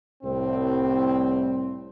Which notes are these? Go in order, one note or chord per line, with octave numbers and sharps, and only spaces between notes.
C2 A2 C4